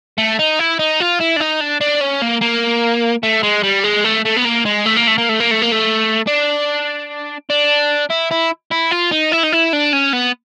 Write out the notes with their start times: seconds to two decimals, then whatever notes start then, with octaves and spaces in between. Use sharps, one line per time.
0.18 A3
0.39 D#4
0.59 E4
0.79 D#4
1.00 F4
1.20 E4
1.36 D4
1.40 D#4
1.60 D4
1.81 D4
2.01 C#4
2.22 A#3
2.42 A#3
3.23 A3
3.43 G#3
3.63 G3
3.84 G#3
4.04 A3
4.25 A3
4.36 B3
4.44 A#3
4.65 G#3
4.86 A3
4.96 A#3
5.07 A3
5.18 A#3
5.29 A3
5.40 A#3
5.51 A3
5.62 A#3
5.72 A3
6.27 D4
7.50 D4
8.10 E4
8.31 E4
8.72 E4
8.91 F4
9.12 D#4
9.32 E4
9.43 D#4
9.53 E4
9.73 D4
9.93 C#4
10.13 B3